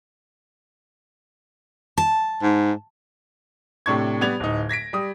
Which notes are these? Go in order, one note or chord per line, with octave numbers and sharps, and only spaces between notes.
A5
G#2
A2 C3 D4 C#6 G#6
G3 B3 D5 G#6 F7
D1 D#4
G#6 A#6 B6 D7
G3 D#6